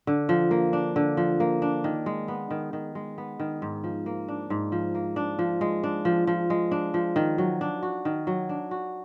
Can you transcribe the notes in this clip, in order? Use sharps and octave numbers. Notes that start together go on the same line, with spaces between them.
D3
F3
A#3
D4
D3
F3
A#3
D4
D#3
G#3
B3
D#3
D#3
G#3
B3
D#3
G#2
F3
A#3
D4
G#2
F3
A#3
D4
F3
G#3
D4
F3
F3
G#3
D4
F3
D#3
F#3
D4
F#4
D#3
F#3
D4
F#4